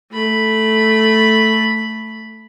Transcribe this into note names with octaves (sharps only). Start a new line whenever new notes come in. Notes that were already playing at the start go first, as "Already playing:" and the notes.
A3 B5